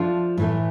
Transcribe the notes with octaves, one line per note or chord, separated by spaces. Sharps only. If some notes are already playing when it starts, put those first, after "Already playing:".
Already playing: F3 A3 D4 F4
A2 E3 A3